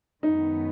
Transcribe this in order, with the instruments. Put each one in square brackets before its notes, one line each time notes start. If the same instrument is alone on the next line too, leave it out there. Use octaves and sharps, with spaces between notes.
[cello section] F#2 D#3 G#3 B3 [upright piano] D#4